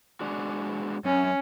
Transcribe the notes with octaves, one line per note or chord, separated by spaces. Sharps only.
G#3 D4 F#4
F#2 C#4